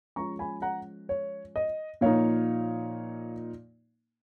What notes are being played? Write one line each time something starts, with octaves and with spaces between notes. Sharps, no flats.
F3 G#3 C#4 A#5 C#6
G#5 B5
F#5 A#5
C#5
D#5
A#2 F3 A#3 D#4 C#5 F5